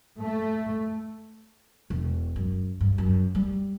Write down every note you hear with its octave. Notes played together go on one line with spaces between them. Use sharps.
A3
E1
F#2
G2
F#2
G3